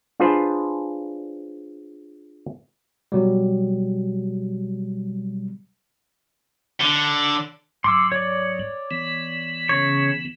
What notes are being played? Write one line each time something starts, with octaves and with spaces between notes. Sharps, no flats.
D4 F4 G#4 B4 C5
B2 F#3 G3
D3
G#2 F#3 C6 D6 E6
C#5 D5
E3 B3
C#3 C#5